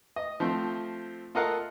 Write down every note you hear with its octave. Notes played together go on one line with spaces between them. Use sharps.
D#5
F3 A3 C4
F4 A4 A#4 D#5 F5 F#5